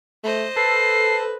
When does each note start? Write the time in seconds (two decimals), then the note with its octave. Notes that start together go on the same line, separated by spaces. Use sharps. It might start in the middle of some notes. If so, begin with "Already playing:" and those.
0.24 A3 C5 D#5
0.56 A4 B4 C7